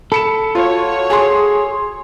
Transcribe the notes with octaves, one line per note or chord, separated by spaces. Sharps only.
A4 B5 C#7 E7
F4 F#4 C#5
G#4 G#5 C6